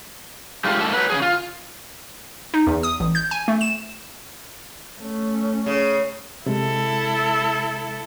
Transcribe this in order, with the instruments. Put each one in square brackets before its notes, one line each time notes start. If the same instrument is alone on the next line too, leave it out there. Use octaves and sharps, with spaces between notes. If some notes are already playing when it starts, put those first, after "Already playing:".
[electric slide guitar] D3 G#3 A3 F4 G4
G#2 A#3 A4 A5
F#3 B4
C#3 F3 G#4
F4
[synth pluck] D#4
E2
D#6
A1
G6
G#5
A3
E7
[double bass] A3 C#4
[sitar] C#3
[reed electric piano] C3 G#3 [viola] E4 A4